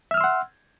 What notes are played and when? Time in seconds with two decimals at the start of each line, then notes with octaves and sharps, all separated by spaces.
0.11 E5
0.14 F6
0.17 E6
0.21 C6
0.24 F#5